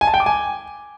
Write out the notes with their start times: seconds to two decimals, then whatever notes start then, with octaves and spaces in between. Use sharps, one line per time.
0.01 G#5
0.07 A5
0.14 G5
0.20 D6
0.26 G#5